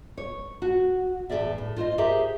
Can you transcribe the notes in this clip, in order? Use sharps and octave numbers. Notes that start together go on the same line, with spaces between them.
C#5
F#4
E2 A2 A3 G#4 D5 E5
A2
F4 C5 C#5 D#5
G4 G#4 A#4 C5 E5